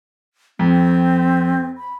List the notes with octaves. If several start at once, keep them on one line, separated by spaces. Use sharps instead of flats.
F2 C4
B5